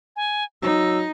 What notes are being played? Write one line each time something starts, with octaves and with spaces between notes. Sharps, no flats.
G#5
F#3 D#4 E6